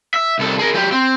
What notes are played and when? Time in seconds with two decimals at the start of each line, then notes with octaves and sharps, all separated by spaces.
0.14 E5
0.39 C2 A4
0.59 G#4 A#4
0.74 F#3 G4
0.92 C4